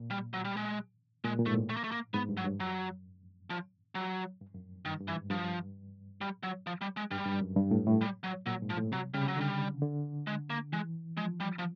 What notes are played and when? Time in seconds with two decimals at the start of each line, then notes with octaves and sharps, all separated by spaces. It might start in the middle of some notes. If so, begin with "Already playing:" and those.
Already playing: A#2
0.10 G3
0.33 F#3
0.45 G3
0.57 G#3
1.24 A#2 G#3
1.39 A#2
1.46 G#2 A3
1.54 A2
1.70 A3
1.77 A#3
1.84 A3
1.91 A#3
2.14 G#2 B3
2.29 G2
2.37 F#3
2.44 G2
2.59 F#2 F#3
3.50 F3
3.95 F#3
4.41 G2
4.55 F#2
4.85 G2 D#3
5.01 G2
5.08 E3
5.15 G#2
5.30 G2 F3
6.21 G3
6.43 F#3
6.67 F3
6.81 G3
6.97 G#3
7.11 G2 G3
7.26 G2
7.41 F#2
7.56 G2
7.71 A2
7.86 A2
8.01 G3
8.24 F#3
8.46 A#2 F#3
8.62 G#2
8.70 F3
8.77 A2
8.92 C3 F#3
9.14 C#3 G3
9.28 F#3
9.37 D3 G3
9.82 D3
10.27 G#3
10.50 A#3
10.73 E3 G#3
11.17 F3 G#3
11.40 G3
11.59 F3